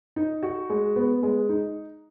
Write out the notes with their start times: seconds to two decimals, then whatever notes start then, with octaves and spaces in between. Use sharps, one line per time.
0.16 D#4
0.43 F#4
0.70 G#3
0.96 B3
1.23 G#3
1.49 D#4